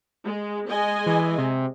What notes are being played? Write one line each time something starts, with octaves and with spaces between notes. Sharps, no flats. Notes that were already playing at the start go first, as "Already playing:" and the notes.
G#3
G#3 D#5 G#5
E3
C3